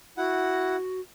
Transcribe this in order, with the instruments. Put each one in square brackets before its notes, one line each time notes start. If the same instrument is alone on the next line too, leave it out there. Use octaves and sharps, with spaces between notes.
[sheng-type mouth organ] E4 F#5 [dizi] F#4